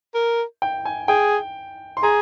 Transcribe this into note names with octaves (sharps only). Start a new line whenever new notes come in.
A#4
G5
G#5
G#4 G5
C6
G#4 A#5